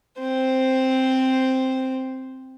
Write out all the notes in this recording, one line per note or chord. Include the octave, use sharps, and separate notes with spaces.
C4 C5